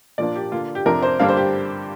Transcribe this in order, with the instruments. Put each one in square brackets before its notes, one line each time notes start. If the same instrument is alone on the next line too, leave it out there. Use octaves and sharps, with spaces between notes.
[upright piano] A#2 F3 A#3 D4 D5
G4
D3 A#3 D4 F4
G4
F2 C3 F3 D4 A#4
C5
G2 D3 G3 A#3 D4 F5
C5
G4